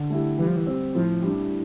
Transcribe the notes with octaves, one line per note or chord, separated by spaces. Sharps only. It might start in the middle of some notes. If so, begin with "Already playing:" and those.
Already playing: D3
A3 E4 G4
E3 G3
F3
E3
C4 G4
A2 F3
G3 D4